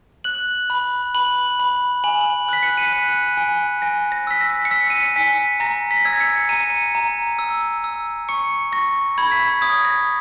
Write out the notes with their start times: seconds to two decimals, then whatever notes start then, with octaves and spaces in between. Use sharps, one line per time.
0.24 F#6 F#7
0.70 B5
1.15 B5 F#7
1.59 B5
2.04 G#5 F#7
2.21 F#7
2.49 F#6 B6
2.63 C#7
2.78 D#7
2.86 C#7
2.92 F#6 B6
3.37 G#5
3.82 G#5 A#6
4.12 A#6
4.27 E6 B6
4.41 A#6
4.65 C#7
4.71 E6 B6
4.90 D#7
5.03 C#7
5.16 G#5 B6
5.60 A#5 A#6
5.91 B6
5.97 A#6
6.05 E6 G#6
6.13 A#6
6.20 C#7
6.49 A#5 D#7
6.60 C#7
6.70 D#7
6.95 A#5
7.39 E6
7.84 E6
8.29 C#6 C#7
8.72 C#6 A#6
9.18 B5 G#6
9.32 B6
9.40 A#6
9.61 D#6 G#6
9.85 A#6